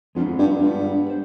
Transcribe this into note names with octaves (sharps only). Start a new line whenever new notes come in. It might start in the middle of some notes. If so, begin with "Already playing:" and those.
F2 G#3 B3 D4 F4
G2
G2 G#3 B3 D4 F4
C5